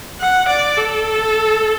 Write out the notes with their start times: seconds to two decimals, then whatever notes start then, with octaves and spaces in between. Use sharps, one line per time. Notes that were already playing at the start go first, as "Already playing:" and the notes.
0.20 F#5
0.48 D5
0.77 A4